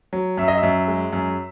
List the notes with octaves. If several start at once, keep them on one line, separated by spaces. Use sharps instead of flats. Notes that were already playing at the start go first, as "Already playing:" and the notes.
F#3
F#2 E5
D#5
E5
F#2
G#3
F#2